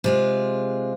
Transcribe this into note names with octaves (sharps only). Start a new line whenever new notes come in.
C3 G#3 F4